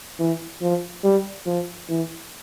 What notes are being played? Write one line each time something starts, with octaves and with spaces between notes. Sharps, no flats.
E3
F3
G3
F3
E3